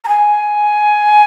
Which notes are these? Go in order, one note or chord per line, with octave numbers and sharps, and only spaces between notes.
A#5
G#5